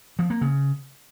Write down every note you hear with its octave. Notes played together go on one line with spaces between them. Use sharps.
F3
A#3
C#3